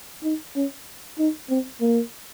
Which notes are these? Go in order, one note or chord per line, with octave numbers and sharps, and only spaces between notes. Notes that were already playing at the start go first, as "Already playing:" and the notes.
D#4
C#4
D#4
C4
A#3